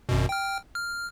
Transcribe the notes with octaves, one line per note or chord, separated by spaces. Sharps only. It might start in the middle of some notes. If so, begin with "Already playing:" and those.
G#1 F#2 B2
G5 F6
F6